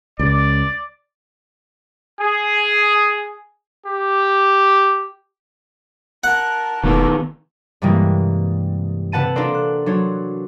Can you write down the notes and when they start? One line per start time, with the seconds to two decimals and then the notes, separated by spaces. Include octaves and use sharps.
0.19 C#2 D5
2.20 G#4
3.86 G4
6.24 A#4 F#5 A5
6.84 E1 D#3 A#3 B3 A4
7.82 G2 C3 E3 G3 G#3 A#3
9.12 C3 B4 F#5 A5 D#7
9.36 D4 F4 A4 A#4 C5 D5
9.54 F#6
9.86 F#3 D4 C5 C#5